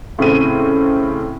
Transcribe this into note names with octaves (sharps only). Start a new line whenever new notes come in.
A2 C#3 C4 D#7